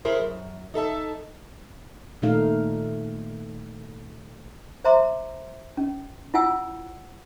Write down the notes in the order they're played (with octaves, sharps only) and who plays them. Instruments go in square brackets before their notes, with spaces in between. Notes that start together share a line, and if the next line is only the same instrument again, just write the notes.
[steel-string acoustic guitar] E4 G#4 A#4 C5
F#2
D#4 A4 E5 A5
[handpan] A#2 D#3 A3 D#4 F5
[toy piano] C5 E5 A#5 C6 D6
C#4
E4 F4 F#5 G#5 E6